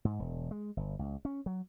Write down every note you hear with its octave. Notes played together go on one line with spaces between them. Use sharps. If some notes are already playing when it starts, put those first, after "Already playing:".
G#2
E1
G#3
G1
C#2
C#4
F#3